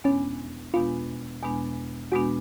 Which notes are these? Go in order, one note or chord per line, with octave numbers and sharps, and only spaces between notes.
E2 B2 G#3 B3 C#4 D4
E2 B2 G#3 B3 D4 F4
E2 B2 G#3 B3 D4
E2 B2 G#3 B3 D4 F#4